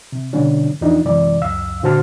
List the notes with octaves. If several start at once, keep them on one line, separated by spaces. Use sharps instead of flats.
C3
B2 D3 G3 C#4 D4
E2 F3 D4 D#4 F4
F#2 C3 E3 G#3 D5
C#2 F#2 F5 E6
A#2 D3 F#4 C5 A5 F6